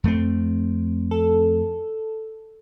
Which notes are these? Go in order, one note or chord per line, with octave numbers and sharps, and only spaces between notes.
F2 A3 C4
A4